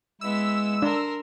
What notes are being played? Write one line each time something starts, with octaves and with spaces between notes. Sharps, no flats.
G#3 B3 E4 E6
D4 A#4 C6